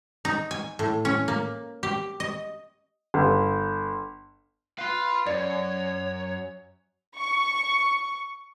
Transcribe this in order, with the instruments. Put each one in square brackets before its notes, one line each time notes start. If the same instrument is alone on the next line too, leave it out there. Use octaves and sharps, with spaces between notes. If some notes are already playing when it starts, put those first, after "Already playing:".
[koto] D#4
G#5
A2
C#4
A#3
G4
D#5
[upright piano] G1
[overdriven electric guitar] B4 [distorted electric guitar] F5 C6
[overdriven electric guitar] F#2 [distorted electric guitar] C#5 [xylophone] D5
[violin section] C#6